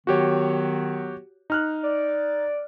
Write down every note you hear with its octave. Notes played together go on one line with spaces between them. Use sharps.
D#3 F#3 B3 F#4 G4 C#5
D#4 F6 F#6
D5